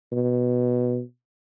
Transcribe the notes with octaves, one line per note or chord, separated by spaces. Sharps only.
B2